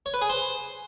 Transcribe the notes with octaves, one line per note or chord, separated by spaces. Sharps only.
C#5
B4
G#4
C5